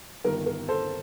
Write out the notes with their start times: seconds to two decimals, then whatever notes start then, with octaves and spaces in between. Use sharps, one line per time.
0.24 G1 G2 D#3 A#4
0.46 A#4
0.68 A4 C5